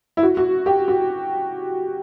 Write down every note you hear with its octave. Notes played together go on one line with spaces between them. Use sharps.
E4
F#4
F#4
G4
F#4